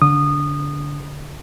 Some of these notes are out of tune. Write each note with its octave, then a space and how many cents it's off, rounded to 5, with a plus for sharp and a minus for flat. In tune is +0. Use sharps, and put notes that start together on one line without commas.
D3 -25 D#6 -20